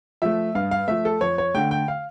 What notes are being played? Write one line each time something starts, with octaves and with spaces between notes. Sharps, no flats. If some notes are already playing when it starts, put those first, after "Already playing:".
F3 A3 E5
G2 F5
F5
F3 A3 E5
A4
F2 C#5
C#5
D3 A3 G5
G5
F5